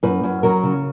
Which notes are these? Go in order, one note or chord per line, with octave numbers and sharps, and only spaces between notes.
F#2 B4
F#2
F#3 A#4
C#3